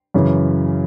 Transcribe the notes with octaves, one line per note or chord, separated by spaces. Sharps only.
F#2 C#3 E3